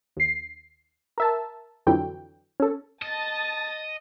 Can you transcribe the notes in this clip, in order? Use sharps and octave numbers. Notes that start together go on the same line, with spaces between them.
D#2 C7
A#4 E5 A5
F2 D3 E3 F#3 G5
C#4 A4
D#5 A5 D#6 A6